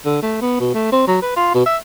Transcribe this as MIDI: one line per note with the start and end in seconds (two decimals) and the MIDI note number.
0.05 0.18 50
0.22 0.37 57
0.42 0.59 59
0.60 0.71 47
0.74 0.90 57
0.92 1.04 60
1.08 1.22 54
1.22 1.36 71
1.36 1.50 65
1.54 1.66 47
1.66 1.77 76